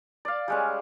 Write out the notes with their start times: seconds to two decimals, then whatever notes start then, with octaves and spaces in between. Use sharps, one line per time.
0.25 D5 F5
0.48 G3 G#3 C#4